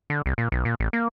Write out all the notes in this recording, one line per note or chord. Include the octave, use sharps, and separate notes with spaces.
D3
C2
A#2
B1
A#2
A1
A#3